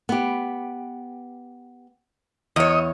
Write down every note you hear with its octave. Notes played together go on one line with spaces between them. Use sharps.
B3 G4
E2 C#5 D#5